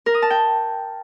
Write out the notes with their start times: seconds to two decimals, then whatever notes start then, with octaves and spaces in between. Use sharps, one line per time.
0.06 A#4
0.14 D#6
0.22 A5
0.30 G5